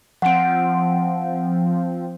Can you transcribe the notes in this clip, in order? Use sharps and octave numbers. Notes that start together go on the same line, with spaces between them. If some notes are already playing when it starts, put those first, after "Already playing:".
F3 C4 F#5 D7